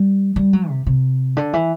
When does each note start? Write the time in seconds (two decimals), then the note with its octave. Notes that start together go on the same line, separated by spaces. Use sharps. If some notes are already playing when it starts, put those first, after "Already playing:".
Already playing: G3
0.36 G3
0.53 F#3
0.69 C3
0.87 C3
1.37 D3
1.53 E3